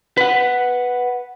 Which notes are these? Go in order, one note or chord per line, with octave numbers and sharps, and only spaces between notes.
B4 F#5